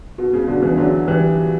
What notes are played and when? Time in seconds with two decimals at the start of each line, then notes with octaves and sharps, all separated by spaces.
0.18 B2
0.33 C#3
0.48 B2 D3
0.62 C#3 E3
0.77 D3 F#3
1.07 E3 G3